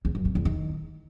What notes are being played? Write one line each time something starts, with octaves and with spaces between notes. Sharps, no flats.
E2
F#2
C3
E2
D#3